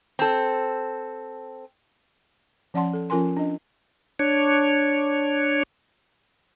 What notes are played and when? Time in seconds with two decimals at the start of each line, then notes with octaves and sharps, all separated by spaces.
0.19 C4 A4
2.74 F3 C#4 D5 F#5 A5 C6
2.93 A4
3.10 F3 C#4 F4 A#4 G#5 C6
3.37 D4 D#5
4.19 D4 C#5